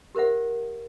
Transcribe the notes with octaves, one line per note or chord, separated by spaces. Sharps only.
G4 A#4 C5 E5 F#5